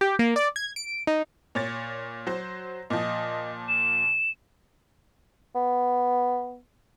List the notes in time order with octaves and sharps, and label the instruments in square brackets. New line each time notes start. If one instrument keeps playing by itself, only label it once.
[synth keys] G4
A#3
D5
G#6
D7
D#4
[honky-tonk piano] A#2 C#5 A6
F#3 C5
[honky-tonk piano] A#2 F3 [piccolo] D#5
[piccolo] E7
[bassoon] B3